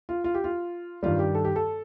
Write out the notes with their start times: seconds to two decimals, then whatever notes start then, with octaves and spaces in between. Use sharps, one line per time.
0.09 F4
0.24 F4
0.34 G4
0.44 F4
1.03 G2 D#3 G3 F4
1.19 G4
1.35 A4
1.45 G4
1.56 A4